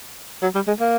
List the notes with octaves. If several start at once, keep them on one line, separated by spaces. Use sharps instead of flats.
F#3
G3
G#3
A#3